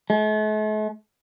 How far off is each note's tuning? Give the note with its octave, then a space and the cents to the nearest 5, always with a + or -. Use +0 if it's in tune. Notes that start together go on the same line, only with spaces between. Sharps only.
A3 -45